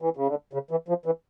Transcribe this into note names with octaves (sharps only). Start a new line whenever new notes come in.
E3
C#3
D3
C#3
E3
F3
E3